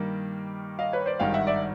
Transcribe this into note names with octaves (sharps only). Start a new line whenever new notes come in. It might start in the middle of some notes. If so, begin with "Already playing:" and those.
Already playing: G2 D#3 G3 A#3
D#5 F5
B4 C#5
C5 D5
G#1 G2 D#3 F5 G5
E5 F#5
D5 E5